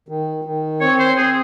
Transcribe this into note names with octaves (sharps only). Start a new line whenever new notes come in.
D#3
D#3
C4 C#5
C5
C4 G#4